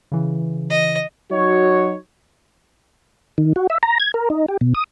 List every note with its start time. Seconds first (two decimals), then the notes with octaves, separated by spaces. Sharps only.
0.12 C#3 E3
0.70 D#5
1.31 F#3 D#4 F#4 C#5
3.38 D#3
3.56 F#4
3.70 E5
3.83 A#5
4.00 G#6
4.14 A#4
4.30 D#4
4.48 G4
4.61 B2
4.75 D#6